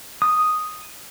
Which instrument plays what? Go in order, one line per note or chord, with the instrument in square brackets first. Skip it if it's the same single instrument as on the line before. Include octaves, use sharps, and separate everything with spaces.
[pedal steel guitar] D#6